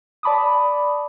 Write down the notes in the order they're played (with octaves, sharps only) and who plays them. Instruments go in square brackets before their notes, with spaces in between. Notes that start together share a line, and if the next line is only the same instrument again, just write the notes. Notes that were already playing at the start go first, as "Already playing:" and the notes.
[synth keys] D5 A5 B5 D6 D#6